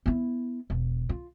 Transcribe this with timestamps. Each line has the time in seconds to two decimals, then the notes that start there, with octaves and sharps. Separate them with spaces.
0.06 B3 E4
0.70 E1
1.09 F4